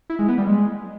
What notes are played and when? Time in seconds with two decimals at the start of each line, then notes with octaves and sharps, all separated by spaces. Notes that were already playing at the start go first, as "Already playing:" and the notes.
0.10 E4
0.19 G#3
0.28 B3
0.38 G3
0.47 G#3